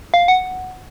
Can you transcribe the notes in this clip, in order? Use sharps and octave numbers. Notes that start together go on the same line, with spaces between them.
F5
F#5